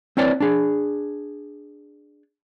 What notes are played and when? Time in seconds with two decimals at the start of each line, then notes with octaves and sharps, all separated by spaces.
0.17 C4 E4 B4 C#5 D5
0.40 D4 G#4